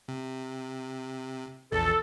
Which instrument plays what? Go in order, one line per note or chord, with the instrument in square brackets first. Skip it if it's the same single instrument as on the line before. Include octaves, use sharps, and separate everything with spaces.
[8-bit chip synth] C3
[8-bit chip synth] A#1 E2 [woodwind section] A4